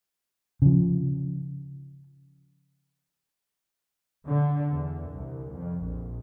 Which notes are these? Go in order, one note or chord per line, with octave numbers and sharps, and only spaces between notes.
C#3 F3
D3
E2
C2
F2
A#1